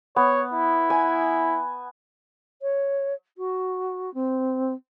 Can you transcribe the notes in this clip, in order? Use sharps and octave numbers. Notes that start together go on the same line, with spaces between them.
B3 C#5
E4
G#5
C#5
F#4
C4